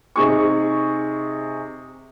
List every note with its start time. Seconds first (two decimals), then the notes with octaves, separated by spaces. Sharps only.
0.16 C3 D#4 G#4 C#6